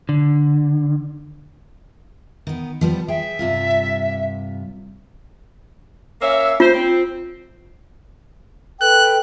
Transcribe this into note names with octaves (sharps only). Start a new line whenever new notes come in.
D3
D#3 B3
F3 G3 B3
G#4 E5 G5
G2 C3 F4
A#3 C#4 E5
F4 C5
C4
A4 B4 G5 F#6